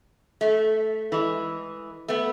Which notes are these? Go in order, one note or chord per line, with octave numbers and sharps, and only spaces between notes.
A3
E3 G#3
A3 B3